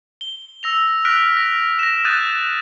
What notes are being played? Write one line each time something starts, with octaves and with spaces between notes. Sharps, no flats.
G7
E6 A#6 F7
F6 F#6 A#6 B6 D7 F7
A#6
A#6 E7
D#6 F#6 G6 A6 D#7